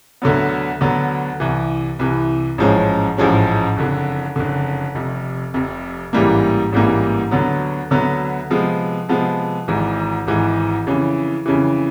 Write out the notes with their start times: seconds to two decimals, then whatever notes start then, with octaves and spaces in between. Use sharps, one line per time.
0.22 D2 D3 F#3 B3
0.81 D2 D3 F#3 B3
1.40 C2 C3 E3
1.99 C2 C3 E3
2.58 A1 G#2 F3 G#3 C#4
3.18 A1 G#2 F3 G#3 C#4
3.77 F#1 F2 D3
4.36 F#1 F2 D3
4.95 F1 F2 C3
5.54 F1 F2 C3
6.13 A1 G#2 E3 G3 A#3
6.72 A1 G#2 E3 G3 A#3
7.31 D2 D3 F#3 B3
7.91 D2 D3 F#3 B3
8.50 C3 F3 G#3 B3
9.09 C3 F3 G#3 B3
9.68 G#1 G#2 E3
10.27 G#1 G#2 E3
10.87 F2 C#3 E3
11.46 F2 C#3 E3